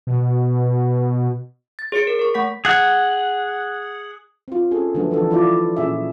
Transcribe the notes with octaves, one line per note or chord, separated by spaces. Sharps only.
B2
A6
G#4 C#5 C#7 D7
A#4
A#4 C#6
A3 F#5 C#6 B6
G#4 F#5
C4 F4
C#4 G#4 A4
D3 F3 F#3 A3 B3 D4
D3 E3 F3 G3 D4 A4
E4 F4 D5
A#2 C#4 G#4 E5